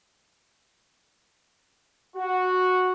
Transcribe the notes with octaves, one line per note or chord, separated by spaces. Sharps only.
F#4